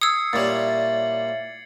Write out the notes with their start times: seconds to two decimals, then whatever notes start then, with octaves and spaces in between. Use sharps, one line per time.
0.01 D#6 E6 G#6 C7 C#7
0.33 A#2 G3 E4 C#5 A6 F#7